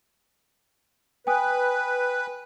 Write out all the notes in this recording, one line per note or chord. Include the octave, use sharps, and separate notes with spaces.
B4 G5 G#5 D#6